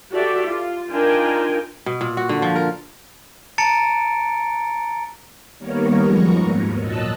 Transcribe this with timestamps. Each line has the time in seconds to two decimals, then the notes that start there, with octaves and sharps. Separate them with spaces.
0.11 F#4 G4 A4 D5 E5
0.46 F4
0.91 D4 D#4 F4 A#4 G5 G#5
1.86 B2
2.01 A#2
2.17 F#4
2.29 D3
2.42 F3
2.56 A#4
3.58 A5 A#5 A6 C#7 D7
5.58 D#3 G3 A#3 B3 A#4 C#5
6.00 F#2 F3 G#3 B3 A#5 C#6
6.31 D#2 G#2
6.78 A#2 F#3 D#5 A5 E6 F#6